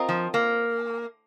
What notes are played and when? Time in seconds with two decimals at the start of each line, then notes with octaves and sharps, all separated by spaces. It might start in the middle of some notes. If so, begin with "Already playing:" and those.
Already playing: C4 F4 A#4 D#5
0.09 F3
0.34 A#3